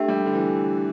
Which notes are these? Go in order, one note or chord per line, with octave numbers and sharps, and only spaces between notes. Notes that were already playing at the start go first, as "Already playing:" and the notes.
Already playing: A3 D4 G4 E5 G5
G3
D3
E3